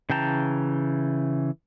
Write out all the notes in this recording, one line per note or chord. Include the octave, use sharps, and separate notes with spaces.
C#3 E3 G5 A5 A#5